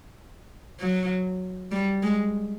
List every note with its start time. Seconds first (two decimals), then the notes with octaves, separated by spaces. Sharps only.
0.80 F#3
1.71 G3
2.03 G#3